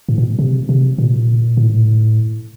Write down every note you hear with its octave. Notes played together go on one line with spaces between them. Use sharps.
A2
A#2
C3
C3
A#2
A2